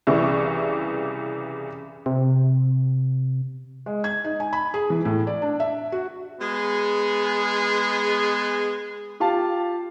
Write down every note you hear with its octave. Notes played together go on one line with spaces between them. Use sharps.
C2 C#3 E3 C#6
C3
G#3
G#6
D#4
G#5
B5
G#4
E3
A2
D5
D4
E5
F#4
G#3 B3 G#4
F4 G4 F5 A5